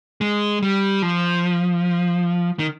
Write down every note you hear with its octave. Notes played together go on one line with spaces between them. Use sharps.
G#3
G3
F3
D#3